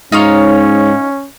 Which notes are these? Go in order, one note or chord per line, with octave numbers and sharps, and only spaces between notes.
G#2 C#4 D#4 F4 C#5